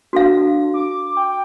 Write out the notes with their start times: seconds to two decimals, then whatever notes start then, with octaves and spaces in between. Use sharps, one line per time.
0.13 D4 F#4 A4 F5
0.74 D6
1.17 G5